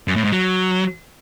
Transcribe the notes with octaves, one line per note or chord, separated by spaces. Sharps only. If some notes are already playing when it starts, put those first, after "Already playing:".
F#2
A2
G#2
F#3